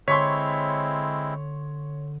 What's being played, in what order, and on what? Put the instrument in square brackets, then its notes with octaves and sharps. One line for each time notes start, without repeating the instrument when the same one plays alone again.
[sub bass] D3 [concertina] G#3 C4 E4 [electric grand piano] C#5 [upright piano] C6 C#6 B6